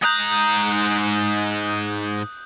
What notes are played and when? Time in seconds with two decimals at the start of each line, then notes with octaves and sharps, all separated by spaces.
0.03 G#2 A#5 D#6 F#6 G6